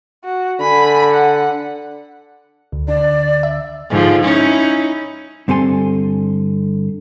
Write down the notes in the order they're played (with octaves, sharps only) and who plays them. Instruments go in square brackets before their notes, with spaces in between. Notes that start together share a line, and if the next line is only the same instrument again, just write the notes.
[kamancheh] F#4
[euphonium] D3 [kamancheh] G#5 B5
[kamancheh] F#5
[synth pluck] D2
[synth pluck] D3 [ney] D5
[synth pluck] E5
[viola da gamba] G#2 D3 F3
C#4 D#4 E4
[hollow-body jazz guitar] G2 D3 C4 A4 G#5 C6